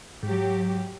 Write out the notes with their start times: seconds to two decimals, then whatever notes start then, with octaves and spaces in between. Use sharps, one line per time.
0.23 G#2 F#3 G4